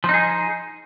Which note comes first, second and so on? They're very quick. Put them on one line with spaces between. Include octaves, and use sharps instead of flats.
F3 D#4 G#4